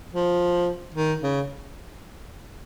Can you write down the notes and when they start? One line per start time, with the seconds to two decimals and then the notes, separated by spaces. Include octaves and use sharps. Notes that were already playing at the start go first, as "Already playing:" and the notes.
0.13 F3
0.94 D#3
1.22 C#3